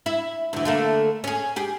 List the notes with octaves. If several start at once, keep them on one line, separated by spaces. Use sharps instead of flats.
E4
D2 E3
D3 A3 A#3
C#4 G#4
G4 G#4